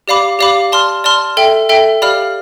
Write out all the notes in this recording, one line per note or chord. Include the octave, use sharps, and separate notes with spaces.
G4 D5 F5 B5 D6
G4 D5 F5 B5 D6
D5 A5 C6 F6
D5 A5 C6 F6
A4 E5 G5
A4 E5 G5
G4 D5 F5 B5 F6